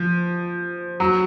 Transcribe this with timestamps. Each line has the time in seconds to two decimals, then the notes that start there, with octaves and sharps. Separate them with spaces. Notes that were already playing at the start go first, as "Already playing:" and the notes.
Already playing: F3
1.00 F#3